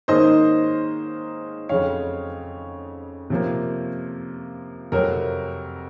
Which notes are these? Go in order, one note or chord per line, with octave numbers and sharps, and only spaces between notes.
G#2 D#3 A#3 C#4 C5 D#5
F2 C#3 F#3 C#5 F5
C3 F3 A#3
F2 C3 F#3 A#4